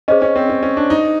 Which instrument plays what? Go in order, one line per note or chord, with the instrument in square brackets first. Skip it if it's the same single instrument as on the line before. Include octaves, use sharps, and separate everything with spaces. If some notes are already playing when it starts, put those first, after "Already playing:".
[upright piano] C#4 [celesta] G#4 C5 D#5
[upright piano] C#4
C4
C#4
C#4
D4
D#4